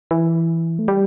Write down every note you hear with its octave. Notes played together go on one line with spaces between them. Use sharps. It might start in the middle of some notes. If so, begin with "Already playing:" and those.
E3
A3
G3